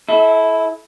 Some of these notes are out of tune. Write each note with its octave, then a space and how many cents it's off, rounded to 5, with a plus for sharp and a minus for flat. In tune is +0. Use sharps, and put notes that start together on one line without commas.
E4 +0 A4 -25 E5 -35